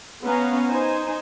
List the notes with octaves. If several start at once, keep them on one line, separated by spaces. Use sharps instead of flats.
B3 C#4 F5 A#5
D#4 C5 G#5